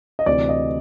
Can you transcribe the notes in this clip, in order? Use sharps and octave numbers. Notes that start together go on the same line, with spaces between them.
D#5
D2 C3 E3 D5
D#5